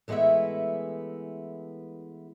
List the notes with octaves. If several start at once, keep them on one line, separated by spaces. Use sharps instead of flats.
E3 G#3 A3 B3 E4 E5